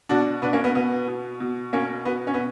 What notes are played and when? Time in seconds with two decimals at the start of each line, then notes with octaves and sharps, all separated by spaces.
0.09 B2 D4 F#4
0.42 B2 B3 D4
0.53 A#3 C#4
0.64 B3
0.75 B2 B3
1.08 B2
1.40 B2
1.73 B2 A#3 C#4
2.05 B2 B3
2.27 C#4
2.34 B3